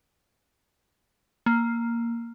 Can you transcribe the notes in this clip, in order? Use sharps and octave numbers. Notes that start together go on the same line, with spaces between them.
A#3